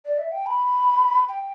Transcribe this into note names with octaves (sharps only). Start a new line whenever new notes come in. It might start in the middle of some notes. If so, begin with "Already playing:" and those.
D5
E5
G5
B5
G5